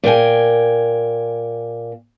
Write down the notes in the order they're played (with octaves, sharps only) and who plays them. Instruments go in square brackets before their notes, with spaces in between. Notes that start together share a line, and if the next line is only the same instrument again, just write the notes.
[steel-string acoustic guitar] A#2 A#4 G5 G#5